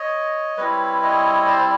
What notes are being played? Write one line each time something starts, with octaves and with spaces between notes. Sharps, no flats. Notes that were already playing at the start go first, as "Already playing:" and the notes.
Already playing: C#5 D#5
G3 C4 E4 B4 C#5
C#5 D#5
C5 D5